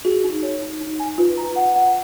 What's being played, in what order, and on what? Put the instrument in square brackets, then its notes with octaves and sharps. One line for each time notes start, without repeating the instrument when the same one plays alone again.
[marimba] F#4 [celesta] G#4
[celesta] D#4
C#5
D#4
D#4
G#5
[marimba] F4 [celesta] B4
[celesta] A#5
F#5
F#5